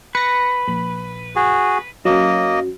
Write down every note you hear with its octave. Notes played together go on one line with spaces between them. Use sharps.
B4 A#6 C#7
A#1 B5
F#4 G#4
F#2 F#3 A#3 D#5